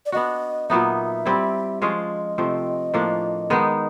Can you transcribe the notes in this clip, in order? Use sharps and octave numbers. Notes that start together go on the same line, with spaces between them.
D5
B3 D4 F#4 D#5
A#2 F#3 B3 D#4 E5
G3 C4 E4
F3 G#3 C#4 F4 D#5
C3 F3 A3 C4
A2 F3 A#3 D4
D#3 G#3 B3 D#4